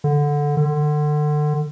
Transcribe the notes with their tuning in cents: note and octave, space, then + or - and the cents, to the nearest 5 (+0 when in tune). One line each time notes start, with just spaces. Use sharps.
D3 -5
D3 +30